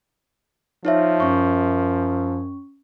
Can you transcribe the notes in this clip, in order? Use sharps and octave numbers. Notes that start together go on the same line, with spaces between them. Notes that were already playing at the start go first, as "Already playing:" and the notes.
F3 D#4 C#5 E5
F#2 C#4 C#6